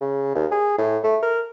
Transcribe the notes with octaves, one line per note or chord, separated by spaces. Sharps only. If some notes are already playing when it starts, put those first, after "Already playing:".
C#3
D#2
G#4
A2
A3
A#4